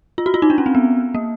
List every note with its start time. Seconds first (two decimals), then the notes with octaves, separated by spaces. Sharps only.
0.18 F4
0.26 F#4
0.34 F4
0.42 D#4
0.50 D4
0.58 C#4
0.66 C4
0.75 B3
1.15 A#3